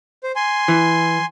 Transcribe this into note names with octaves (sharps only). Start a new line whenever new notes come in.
C5
G#5 C6
E3